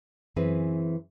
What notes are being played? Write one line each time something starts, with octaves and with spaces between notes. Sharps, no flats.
F#2 E3 C4 G#4 B4